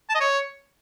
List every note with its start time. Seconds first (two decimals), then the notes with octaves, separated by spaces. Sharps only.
0.10 A5
0.15 D#5
0.20 C#5